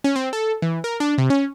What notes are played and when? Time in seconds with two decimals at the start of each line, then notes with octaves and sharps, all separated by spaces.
0.04 C#4
0.16 C4
0.33 A4
0.62 E3
0.84 A#4
1.00 D4
1.18 C3
1.30 C#4